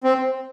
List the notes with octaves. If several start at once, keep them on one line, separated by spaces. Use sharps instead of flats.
C4